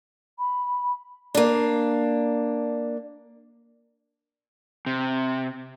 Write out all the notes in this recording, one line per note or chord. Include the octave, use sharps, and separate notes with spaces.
B5
A#3 D4
C3